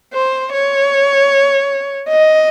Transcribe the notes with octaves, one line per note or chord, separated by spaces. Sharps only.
C5
C#5
D#5